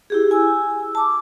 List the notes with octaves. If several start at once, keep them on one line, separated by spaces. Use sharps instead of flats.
E4 G4 G#4
G#5 E6
A5 D6